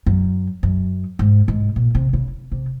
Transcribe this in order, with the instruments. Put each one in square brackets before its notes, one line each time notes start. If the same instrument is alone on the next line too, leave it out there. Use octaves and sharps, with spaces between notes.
[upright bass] F#2
F#2
G#2
G#2
A#2
C3
C#3
C3